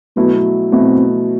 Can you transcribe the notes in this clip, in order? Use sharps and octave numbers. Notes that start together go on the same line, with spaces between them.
B2 F#3 A3 B3 E4
B2 F#3 A3 C4 E4